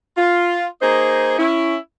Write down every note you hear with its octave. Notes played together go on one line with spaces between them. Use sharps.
F4
A#3 D#4 G#4 C5
C#4 E4